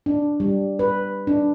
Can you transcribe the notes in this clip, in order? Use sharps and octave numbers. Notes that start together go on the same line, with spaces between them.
D4
G3
B4
D4